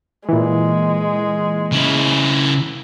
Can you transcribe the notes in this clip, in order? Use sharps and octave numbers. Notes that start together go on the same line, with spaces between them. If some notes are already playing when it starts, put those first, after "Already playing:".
A#2 E3 G#3
C#3 E4